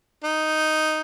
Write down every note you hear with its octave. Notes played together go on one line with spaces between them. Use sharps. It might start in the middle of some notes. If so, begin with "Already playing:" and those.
D#4